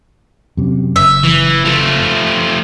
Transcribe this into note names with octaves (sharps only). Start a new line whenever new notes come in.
F#2 C3
F#1 E5
E3
F3 A3